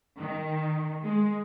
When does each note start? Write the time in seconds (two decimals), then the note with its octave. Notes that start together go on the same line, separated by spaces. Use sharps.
0.18 D#3
1.01 G#3